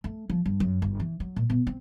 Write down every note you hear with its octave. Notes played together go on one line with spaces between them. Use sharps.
A3
F3
G2
F#2
G1
E3
F#3
A#2
B2
C4